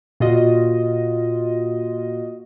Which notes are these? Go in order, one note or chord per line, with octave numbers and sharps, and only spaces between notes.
A#2 F4 F#4 D#5